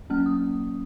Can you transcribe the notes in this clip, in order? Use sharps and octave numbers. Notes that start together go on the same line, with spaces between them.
F#3 A#3 C#4 F6
D#6